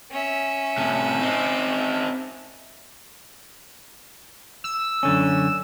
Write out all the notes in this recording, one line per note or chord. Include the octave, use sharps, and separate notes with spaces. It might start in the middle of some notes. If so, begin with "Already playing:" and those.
C#4 E5
A2 C3
C4 D#4
E6
F#2 D3 C#4